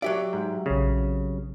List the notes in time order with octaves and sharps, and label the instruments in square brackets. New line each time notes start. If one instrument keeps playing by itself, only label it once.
[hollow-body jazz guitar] F#3 G4 D5 [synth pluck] E5
[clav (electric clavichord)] G#2
[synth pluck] A#1 C4 [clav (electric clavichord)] C#3